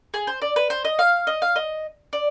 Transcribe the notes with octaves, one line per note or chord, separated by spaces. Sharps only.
G#4
C5
D5
B4
C5
D#5
F5
D#5
F5
D#5
D5